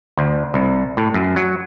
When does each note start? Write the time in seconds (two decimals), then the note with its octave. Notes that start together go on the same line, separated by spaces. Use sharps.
0.17 D2
0.54 C2
0.97 A2
1.14 F#2
1.36 F#3